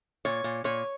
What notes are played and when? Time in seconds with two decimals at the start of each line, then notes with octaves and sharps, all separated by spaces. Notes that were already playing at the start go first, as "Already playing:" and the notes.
0.25 A#2 C#5
0.44 A#2
0.64 A#2 C#5